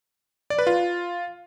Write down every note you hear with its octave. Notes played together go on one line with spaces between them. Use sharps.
D5
B4
F4